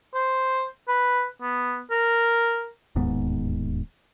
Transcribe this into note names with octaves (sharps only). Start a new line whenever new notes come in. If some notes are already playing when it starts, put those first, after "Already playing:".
C5
B4
B3
A#4
D1 D#2 G#2 B3